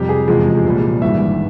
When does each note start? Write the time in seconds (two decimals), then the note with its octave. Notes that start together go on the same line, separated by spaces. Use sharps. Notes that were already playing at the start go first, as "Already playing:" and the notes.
Already playing: F2 C3 G3 G4
0.09 G#4
0.28 E2 C3 F3 G#3
0.65 C2 A#2 G3
1.02 G#1 G2 E3 E5